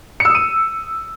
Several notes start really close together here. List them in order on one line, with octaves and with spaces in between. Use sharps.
C#7 E6 D#6 D#7